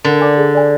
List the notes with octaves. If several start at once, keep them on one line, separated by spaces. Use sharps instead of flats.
D3 A#4
D5 G#5 D6
G#4
D5 G#5